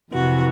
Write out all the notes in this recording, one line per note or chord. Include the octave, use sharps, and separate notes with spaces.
F2 C3 E3 F#4